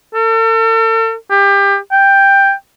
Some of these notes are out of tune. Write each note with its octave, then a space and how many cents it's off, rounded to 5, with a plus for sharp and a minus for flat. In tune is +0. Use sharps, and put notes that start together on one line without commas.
A4 +40
G4 +25
G5 +5